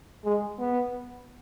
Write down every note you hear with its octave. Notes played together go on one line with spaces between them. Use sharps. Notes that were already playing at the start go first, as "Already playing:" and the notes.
G#3
B3